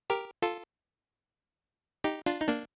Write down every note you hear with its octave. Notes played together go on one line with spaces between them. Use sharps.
G4 A#4
F4 A4
D#4 G4
D4 F4
D#4
A#3 D4